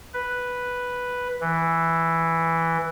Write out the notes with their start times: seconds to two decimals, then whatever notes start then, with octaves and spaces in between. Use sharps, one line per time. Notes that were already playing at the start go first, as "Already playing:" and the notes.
0.14 B4
1.40 E3